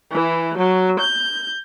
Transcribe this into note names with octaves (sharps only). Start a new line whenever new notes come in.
E3
F#3
G6